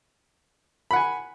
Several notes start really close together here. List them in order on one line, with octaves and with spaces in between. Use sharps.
B5 F#5 G#5